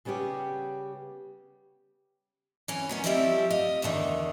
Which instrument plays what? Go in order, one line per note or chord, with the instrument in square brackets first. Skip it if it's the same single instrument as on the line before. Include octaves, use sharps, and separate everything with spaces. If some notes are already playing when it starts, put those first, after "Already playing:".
[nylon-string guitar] C#3 G3 B3 C#4 G4
[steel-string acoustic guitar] E3 C#4
D#3 B3 C#4
D#3 F3 G3 C4 E4 G4
D#5 F5
E2 B2 D3 D#3